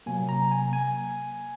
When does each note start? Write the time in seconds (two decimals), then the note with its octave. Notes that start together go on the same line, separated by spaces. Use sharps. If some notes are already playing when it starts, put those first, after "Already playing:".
0.06 C3 F#3 A#3 G#5
0.29 A#5
0.52 G#5
0.73 G#5